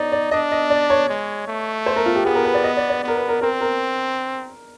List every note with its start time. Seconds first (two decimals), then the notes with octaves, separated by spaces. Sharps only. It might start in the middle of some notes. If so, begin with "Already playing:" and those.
Already playing: D#4 C#5 D5
0.12 D5
0.31 D4 D#5
0.52 D#5
0.70 D5
0.90 C#5
1.09 G#3
1.47 A3
1.86 C5
1.96 A#4
2.06 F4
2.15 G4
2.25 B3 G#4
2.35 A#4
2.45 B4
2.54 D5
2.64 D#5
2.77 D5
2.90 D5
3.03 B3 A#4
3.16 B4
3.28 A#4
3.41 C4 A#4
3.61 A#4